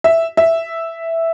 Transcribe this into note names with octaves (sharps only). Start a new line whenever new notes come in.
E5
E5